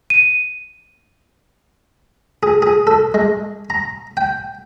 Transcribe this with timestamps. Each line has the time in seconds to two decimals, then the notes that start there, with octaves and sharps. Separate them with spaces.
0.10 D#7
2.43 G#4
2.62 G#4
2.87 A4
3.14 G#3
3.70 A#5
4.17 G5